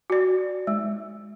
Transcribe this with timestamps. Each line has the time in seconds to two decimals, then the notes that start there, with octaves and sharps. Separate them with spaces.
0.10 F#4 D5
0.67 G#3